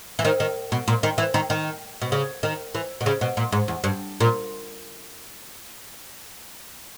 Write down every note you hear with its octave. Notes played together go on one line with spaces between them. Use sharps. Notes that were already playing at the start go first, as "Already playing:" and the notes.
E3
D#3
D#3
B2
A#2
D#3
E3
D#3
D#3
B2
C#3
D#3
E3
B2
C#3
B2
A#2
G#2
E2
G2
A#2